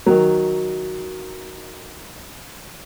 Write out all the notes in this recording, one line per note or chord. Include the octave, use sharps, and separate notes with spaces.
D#3 F#3